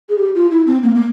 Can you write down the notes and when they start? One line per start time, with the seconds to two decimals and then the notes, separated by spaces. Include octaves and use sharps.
0.09 G#4
0.18 G4
0.35 F4
0.51 E4
0.67 C4
0.83 A#3
0.95 A#3